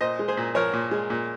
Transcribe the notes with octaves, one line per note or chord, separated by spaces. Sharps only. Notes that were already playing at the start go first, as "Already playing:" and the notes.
A#2 C5 D#5
G#3
G#4 C5
A#2
F3 A#4 C#5
A#2
G#3
A#2